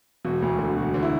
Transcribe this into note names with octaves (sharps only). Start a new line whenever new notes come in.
E1 F#4
D2
D3
E1 F#4
D3
E4